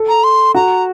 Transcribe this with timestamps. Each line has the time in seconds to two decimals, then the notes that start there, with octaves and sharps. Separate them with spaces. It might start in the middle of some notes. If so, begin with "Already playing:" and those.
Already playing: A4
0.09 A#5
0.24 C6
0.54 F#4 A#5